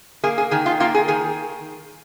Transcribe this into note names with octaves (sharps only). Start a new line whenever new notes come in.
A#3 G#4
G#4
D#3 G#4
F4
A#3 F4
G#4
D#3 G#4